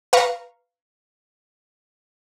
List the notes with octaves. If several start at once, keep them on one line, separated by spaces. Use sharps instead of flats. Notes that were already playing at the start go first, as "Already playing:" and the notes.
B4 F5 A#5 C#6